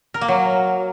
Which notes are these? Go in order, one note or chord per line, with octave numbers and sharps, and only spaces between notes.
A#4
A#3
F#3